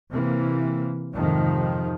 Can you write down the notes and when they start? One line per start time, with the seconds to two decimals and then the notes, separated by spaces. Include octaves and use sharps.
0.12 C3 E3 A#3
1.12 F2 G#2 C3 D#3 F3